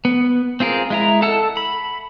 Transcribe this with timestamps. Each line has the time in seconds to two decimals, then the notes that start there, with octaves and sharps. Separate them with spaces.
0.05 B3
0.60 C4 F4 G#4 A#4
0.90 G#3 E4 A#5
1.22 A4 F#5 A5 E6
1.57 B5